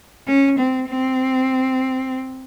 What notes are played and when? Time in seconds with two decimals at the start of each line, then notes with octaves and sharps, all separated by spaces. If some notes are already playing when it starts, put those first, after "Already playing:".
0.27 C#4
0.58 C4
0.88 C4